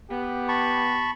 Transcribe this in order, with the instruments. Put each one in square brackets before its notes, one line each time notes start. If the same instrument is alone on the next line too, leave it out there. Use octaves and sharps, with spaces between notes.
[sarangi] B3 [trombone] G4
[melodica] A5 B5 C#6